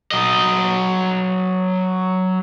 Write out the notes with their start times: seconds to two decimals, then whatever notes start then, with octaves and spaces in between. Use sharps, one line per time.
0.11 F#3 D#5